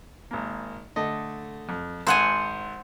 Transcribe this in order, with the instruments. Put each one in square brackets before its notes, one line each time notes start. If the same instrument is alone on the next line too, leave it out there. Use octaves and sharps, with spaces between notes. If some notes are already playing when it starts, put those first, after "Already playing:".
[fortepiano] G#1 A#3
D3 A3 D#5
F2
[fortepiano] G#1 C6 [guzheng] C5 F#5 G#5